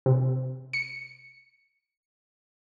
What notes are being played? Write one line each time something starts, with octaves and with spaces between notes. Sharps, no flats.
C3
C#7